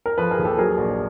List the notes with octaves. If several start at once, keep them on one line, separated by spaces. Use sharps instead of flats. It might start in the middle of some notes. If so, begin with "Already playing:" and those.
A#4
F3 A4 B4
G#4 A#4
D#2
G4 A4
F#3 G#4 A#4
A#1